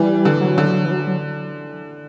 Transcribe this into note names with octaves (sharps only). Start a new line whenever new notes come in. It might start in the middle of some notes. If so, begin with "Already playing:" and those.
Already playing: E3 G3
D3
F#3
D3
E3
F#3
F#3